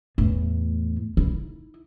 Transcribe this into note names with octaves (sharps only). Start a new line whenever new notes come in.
E2 A2
D#4 E4